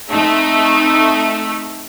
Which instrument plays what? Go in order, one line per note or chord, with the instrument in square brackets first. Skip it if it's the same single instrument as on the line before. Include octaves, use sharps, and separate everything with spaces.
[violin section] A3 [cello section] C4 D#4